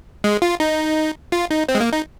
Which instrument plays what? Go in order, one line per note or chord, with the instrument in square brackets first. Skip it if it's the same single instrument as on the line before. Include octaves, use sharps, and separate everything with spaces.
[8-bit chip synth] G#3
F4
D#4
F4
D#4
C4
G#3
A#3
D#4